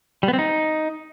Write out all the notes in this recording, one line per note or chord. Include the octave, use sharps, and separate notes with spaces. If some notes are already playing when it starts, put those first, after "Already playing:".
G3
B3
C4
D#4